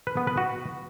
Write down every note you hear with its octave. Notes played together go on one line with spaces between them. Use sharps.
B4
B3
B4
F#4